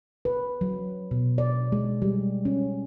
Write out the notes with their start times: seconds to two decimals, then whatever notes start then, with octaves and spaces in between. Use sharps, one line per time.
0.25 B4
0.61 F#3
1.11 B2
1.38 D5
1.72 G#3
2.02 G3
2.45 C#4